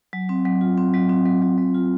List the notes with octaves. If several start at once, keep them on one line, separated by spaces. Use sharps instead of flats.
F#3
C4
F#3
F4
C4
F#3
C4
F#3
F#3
F#3
F4